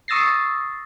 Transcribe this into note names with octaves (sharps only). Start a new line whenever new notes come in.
C#6 D#6 E6 A6 A#6 C7